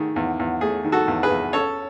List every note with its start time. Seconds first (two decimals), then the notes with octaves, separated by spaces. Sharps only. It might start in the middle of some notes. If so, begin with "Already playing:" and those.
Already playing: D#3 A3 G#4
0.16 E2
0.39 E2
0.61 A3 G#4
0.84 D#3
0.92 F#4 A4
1.08 E2
1.23 G#4 B4
1.31 E2
1.53 C#4 A4 C#5